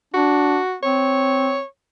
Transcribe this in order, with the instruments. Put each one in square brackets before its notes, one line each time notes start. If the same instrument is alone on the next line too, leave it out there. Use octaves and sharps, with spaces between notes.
[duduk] D4 [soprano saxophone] F#4
[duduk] C4 [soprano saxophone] C#5